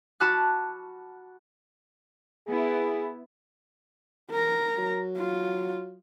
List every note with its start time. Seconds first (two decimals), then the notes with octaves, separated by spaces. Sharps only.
0.20 F#4 A5 B5 D6 F6 F#6
2.47 B3 E4 G#4
4.31 A#4 A#5
4.78 F#3
5.17 F4